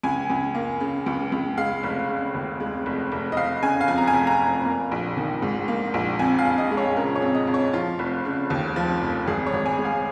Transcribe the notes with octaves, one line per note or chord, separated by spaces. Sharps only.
C#2 G#5
C#2
A#3
C#3
C#2
C#2
G#3 F5
F1
C#3
D#2
G#3
F1
F1
D#5
F1 F5
C#3 G#5
F5
F2 G#5
A#5
G#5
F1
A#5
F1
A#3
A#1
D#3
G#2
A#3
A#1
F2 G#5
F5
F2
D#5
G#3
C#5
C#3 A#4
C#5
F2
D#5
F2
C#5
F3 F4
F1
C#3
D#2
F3
F1
G#1 G#4
C#5
G#1
G#5
G#3
F5